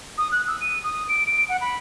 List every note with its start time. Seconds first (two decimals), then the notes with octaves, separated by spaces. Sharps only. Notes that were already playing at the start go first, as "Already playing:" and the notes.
0.18 D#6
0.32 F#6
0.48 E6
0.61 D#7
0.84 D#6
1.09 D7
1.27 D7
1.49 F#5
1.61 B5